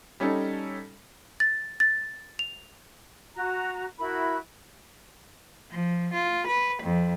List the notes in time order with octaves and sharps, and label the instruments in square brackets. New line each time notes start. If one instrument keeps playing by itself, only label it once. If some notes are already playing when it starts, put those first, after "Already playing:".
[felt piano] G3 C#4 D#4 A4
[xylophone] A6
A6
F7
[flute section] F#4 A#5
E4 F#4 A#4 B5
[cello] F3
F4
B4
F2